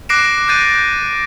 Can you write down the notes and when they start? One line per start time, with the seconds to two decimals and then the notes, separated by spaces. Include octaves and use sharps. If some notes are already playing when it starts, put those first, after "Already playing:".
0.09 D6 F#6 A#6 C7 D7 E7
0.48 D6 F#6 G6 A6 D#7